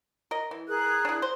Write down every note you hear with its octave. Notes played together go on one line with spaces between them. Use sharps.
A#4 D#5
E3
G#4 A#4 F#6
D4 E4
C5